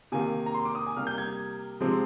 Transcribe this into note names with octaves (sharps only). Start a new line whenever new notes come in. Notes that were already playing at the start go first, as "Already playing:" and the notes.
C3 D#3 A#3 G#5
A#5
C6
D6
D#6
G#5
C3 G3 A#3 F6
G6
G#6
C3 F3 G#3 C4